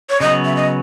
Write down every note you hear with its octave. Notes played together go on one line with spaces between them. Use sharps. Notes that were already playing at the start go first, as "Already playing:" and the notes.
C#5
C#3 F#3 B3 D#5
E5
D#5